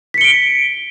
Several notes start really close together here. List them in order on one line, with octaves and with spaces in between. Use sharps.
B6 C#7 G7 D7